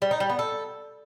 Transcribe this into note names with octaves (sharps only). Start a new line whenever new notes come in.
G3
D#4
G3
B3
A4